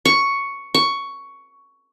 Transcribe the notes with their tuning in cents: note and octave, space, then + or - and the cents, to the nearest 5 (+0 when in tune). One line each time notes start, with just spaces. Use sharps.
C#6 +5
C#6 +10